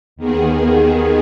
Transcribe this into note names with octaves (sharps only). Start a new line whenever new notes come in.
D#2 D#3 B3 G#4